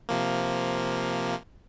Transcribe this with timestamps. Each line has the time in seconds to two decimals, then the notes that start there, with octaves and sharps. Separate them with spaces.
0.09 C3 F3 A#3